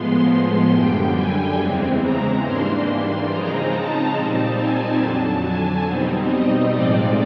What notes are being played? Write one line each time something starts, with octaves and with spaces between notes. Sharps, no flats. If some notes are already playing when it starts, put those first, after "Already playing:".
Already playing: A2 F3 G#3 B3 C6
C6
F#2 D3 G3 G5
G#5
E2 C#3 E3 G#3 C4
A#5
G#2 E3 G3 A#3 D4 C6
C6
C#3 F3 G#3 C4 D#4 A#5
A5
A#2 G3 C4 D#4 A5
G#5
F2 D3 F#3 A5
G#5
B2 G3 C4 D#4
D#5
A2 F3 G#3 C4 D#4 D5